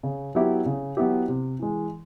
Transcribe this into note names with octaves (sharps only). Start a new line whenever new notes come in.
C#3
F#3 B3 E4 G4
C#3
F#3 B3 E4 G4
C3
E3 G#3